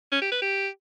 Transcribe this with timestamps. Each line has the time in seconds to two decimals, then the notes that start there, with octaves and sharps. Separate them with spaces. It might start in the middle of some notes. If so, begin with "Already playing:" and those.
0.12 C#4
0.22 G4
0.32 B4
0.42 G4